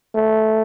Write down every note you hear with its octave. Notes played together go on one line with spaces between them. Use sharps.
A3